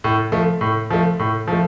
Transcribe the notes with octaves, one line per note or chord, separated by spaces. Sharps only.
A2
F3 A3
A2
F3 A3
A2
F3 A3